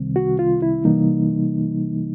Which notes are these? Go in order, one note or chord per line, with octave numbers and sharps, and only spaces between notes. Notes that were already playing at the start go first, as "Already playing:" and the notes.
Already playing: C2 C3 D#3 G3 C4
F#4
F4
E4
C3 E3 G3 A#3 D#4